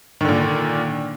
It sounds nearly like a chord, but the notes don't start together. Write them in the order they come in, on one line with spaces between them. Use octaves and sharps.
D#3 D3 A#2